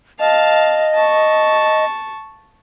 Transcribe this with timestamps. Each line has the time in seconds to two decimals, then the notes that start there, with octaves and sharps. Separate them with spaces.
0.20 D#5 F5 A5
0.95 A5 C#6